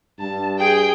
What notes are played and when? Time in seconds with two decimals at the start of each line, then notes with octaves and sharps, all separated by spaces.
0.19 G2 A5
0.60 G#4 G5